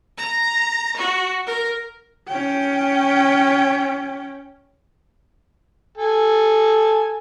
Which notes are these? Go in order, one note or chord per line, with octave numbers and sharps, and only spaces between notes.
A#5
F#4
A#4
C#4 G5
A4 G#5